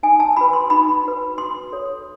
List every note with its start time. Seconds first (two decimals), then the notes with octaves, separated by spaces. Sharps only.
0.03 D#4 G#5
0.20 A5
0.36 F#4 B4 B5
0.53 C6
0.70 D#4 B5
1.05 F#4 B4
1.38 F#4 C6
1.72 A4 C#5